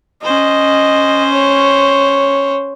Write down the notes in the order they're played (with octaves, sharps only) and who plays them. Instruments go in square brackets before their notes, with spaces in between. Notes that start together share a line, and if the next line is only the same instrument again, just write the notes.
[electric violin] C#4 C5 [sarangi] D#5
[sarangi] C#5